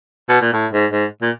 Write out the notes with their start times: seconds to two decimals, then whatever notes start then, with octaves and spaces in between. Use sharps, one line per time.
0.29 B2
0.41 A#2
0.53 A2
0.73 G#2
0.91 G#2
1.22 A#2